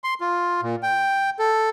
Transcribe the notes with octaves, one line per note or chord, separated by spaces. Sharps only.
C6
F4
A#2
G5
A4